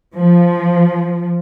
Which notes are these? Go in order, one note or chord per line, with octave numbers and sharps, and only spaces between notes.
F3